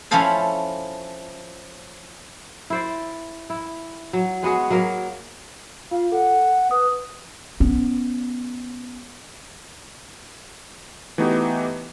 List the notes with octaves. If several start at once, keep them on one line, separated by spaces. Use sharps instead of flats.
F3 C#4 E4 F4 A4 C5
E4 C5 D5
E4
F#3
G#3 B3 F#4 G#4
F#3 A#3 A#4
F4 F5
A4 F#5
B4 D#6
B3 C#4
E3 A3 B3 D#4 F#4 G4